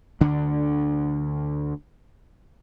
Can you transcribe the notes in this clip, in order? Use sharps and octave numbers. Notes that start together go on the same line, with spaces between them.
D2 D3 D4